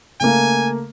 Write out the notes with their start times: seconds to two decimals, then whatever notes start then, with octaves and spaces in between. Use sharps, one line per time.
0.21 C#3 A3 A#3 G#5